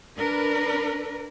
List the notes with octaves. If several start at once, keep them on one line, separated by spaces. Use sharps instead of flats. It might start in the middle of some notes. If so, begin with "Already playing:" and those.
D4 A#4 B4